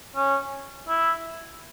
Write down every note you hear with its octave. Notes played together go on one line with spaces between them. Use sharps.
C#4
E4